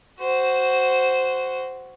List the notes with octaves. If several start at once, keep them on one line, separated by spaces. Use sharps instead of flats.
F#4 C5